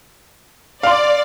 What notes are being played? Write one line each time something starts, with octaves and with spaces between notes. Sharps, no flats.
D5 F5 C6